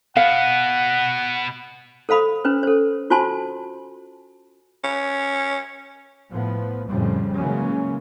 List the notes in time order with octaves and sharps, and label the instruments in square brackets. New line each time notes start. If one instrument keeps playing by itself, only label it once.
[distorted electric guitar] B2 B3 [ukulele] F5 [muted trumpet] F#5
[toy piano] A4 C5 F5 B5 D#6
C#4 B4 C5
A4 C5
F4 F#4 C5 G#5 A5 C6
[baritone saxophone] C#4
[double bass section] A2 F3 B3
F2 A2 C#3 G3
C#3 E3 F#3 G#3 A#3 C#4